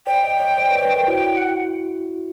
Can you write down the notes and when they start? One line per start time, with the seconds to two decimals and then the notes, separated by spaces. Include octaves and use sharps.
0.07 C5 D5 G5
0.23 C#5 D#5
0.40 C#5 D#5
0.58 C5 D5
0.71 B4 C#5
0.83 B4 C#5
0.96 A#4 C5
1.08 E4 F#4
1.37 F#5